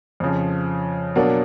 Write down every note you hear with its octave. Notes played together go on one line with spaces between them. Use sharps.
F2 C#3 F3
B2 F#3 A#3 D4